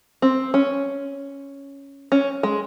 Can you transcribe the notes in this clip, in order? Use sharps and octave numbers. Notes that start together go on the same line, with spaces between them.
C4
C#4
C#4
G#3